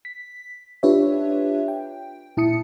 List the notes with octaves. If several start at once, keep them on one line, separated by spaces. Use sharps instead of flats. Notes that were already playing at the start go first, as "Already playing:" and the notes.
B6
D4 F4 G4 B4 C#5 E5
G5
A#2 E4 A5 D#6 C#7